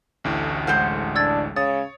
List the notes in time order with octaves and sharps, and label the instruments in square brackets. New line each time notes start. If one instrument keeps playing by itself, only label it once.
[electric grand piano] A1 D2 A2
[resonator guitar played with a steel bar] G#3 C5 F#5 [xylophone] F6
[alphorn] D4 [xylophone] E6 G#6 A6
[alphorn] C#3 [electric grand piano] C#5 D#6 [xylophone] A6